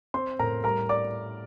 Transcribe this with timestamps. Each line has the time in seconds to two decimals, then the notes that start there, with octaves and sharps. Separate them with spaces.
0.14 C4 C5 C6
0.39 A2 A#4 A#5
0.64 G3 A#4 A#5
0.89 D5 D6